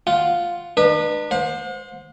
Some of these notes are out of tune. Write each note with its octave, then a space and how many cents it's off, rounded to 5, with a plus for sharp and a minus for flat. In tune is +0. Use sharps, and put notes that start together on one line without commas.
F4 +0 F#5 +10
D4 +45 B4 -15
C5 +0 F#5 -45